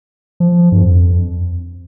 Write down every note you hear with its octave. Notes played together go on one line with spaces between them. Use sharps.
F3
G2
F2